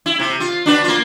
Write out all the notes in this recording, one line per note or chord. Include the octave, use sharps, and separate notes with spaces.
E4
C3
F4
D4 F#4 B4
A#3 F4